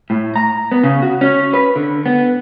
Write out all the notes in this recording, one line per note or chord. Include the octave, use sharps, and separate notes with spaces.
A2
A#5
B3
C#3
F#4
C#4
B4
D3
B3